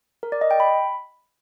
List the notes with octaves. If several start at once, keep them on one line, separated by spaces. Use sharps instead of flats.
A#4
D5
D#5
G5
B5